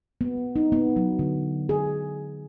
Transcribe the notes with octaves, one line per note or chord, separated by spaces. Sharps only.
B3
D#4
B3
F#3
D3
G#4